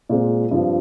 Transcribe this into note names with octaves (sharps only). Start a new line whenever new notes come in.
A#2 G#3 C4
G2 F3 C4